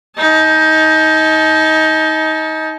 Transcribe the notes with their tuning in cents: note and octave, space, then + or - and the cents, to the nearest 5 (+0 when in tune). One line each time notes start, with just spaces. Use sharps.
D#4 +20 A5 -35